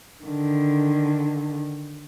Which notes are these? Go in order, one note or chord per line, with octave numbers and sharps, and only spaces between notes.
D3 D#3